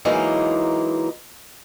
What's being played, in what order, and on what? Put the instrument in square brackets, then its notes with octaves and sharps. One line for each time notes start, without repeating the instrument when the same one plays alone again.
[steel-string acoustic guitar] E3 F#3 G#3 A#3 D#4